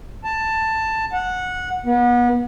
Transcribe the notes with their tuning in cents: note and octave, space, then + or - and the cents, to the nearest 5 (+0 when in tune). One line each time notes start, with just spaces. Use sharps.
A5 +10
F#5 -15
B3 -30